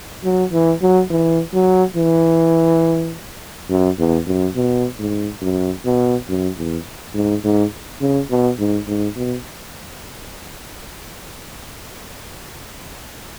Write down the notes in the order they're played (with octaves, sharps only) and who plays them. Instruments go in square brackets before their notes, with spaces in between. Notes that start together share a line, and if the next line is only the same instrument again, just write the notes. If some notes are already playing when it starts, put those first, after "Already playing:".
[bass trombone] F#3
E3
F#3
E3
F#3
E3
F#2
E2
F#2
B2
G#2
F#2
B2
F#2
E2
G#2
G#2
C#3
B2
G#2
G#2
B2